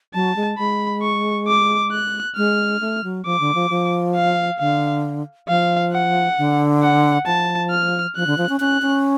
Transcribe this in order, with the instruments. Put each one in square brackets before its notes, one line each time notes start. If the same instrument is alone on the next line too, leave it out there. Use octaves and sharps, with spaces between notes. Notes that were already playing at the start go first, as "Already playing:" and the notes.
[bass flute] F#3 [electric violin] A5
[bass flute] G#3
[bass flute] G#3 [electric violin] B5
[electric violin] C#6
D6
F#6
[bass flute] G#3 [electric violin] F6
[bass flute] A3
F#3
[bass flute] F3 [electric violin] D6
[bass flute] D3
F3
F3
[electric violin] F5
[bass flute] D3 [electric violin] F5
[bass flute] F3 [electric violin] F5
[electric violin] F#5
[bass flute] D3
[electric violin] F#5
[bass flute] F3 [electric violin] A5
[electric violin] F6
[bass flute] F3 [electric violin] F#6
[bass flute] D3
F3
C#4
[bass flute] C#4 [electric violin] F#6
[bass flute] C#4